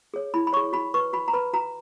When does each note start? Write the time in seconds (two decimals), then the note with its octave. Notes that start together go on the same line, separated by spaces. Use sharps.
0.14 G#4 C#5
0.34 E4 B5
0.47 B5
0.53 G#4 C#5 C#6
0.73 F#4 B5
0.94 B4 C#6
1.13 F#4 B5
1.28 A#5
1.33 B4 B5
1.53 F#4 A#5